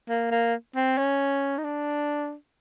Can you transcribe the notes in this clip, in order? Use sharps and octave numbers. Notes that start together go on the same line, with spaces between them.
A#3
A#3
C4
C#4
D#4
D4